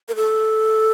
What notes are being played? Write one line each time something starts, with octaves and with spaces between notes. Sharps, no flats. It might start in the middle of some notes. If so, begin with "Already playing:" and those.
A#4
A4